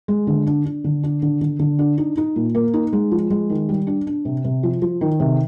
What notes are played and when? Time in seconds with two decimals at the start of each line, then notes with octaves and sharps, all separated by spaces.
0.08 G#3
0.27 D3
0.47 D4
0.65 D4
0.84 D3
1.03 D4
1.22 D3
1.41 D3
1.59 D3
1.79 D4
1.98 D#4
2.17 D#4
2.36 A#2
2.55 A#3
2.74 D#4
2.93 G#3
3.11 F3
3.31 G#3
3.50 D#3
3.69 G3
3.87 D4
4.07 D4
4.25 C3
4.45 C3
4.63 F3
4.82 F3
5.01 D#3
5.20 C3